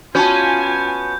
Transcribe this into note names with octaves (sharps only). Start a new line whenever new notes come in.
B3 C#4 F4 F#4 G#5 A5 G6